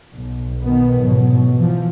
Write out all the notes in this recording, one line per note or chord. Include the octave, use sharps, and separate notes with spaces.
B1
B2 D#3 B3
A1 G#2 B2 F#3
E3 F3